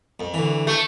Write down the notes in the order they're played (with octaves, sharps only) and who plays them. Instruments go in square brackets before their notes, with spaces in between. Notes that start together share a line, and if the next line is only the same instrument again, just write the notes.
[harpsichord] F2
D2 E3
[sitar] A3